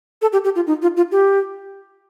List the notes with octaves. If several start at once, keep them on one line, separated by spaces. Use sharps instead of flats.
A4
G4
G4
F4
D#4
F4
F4
G4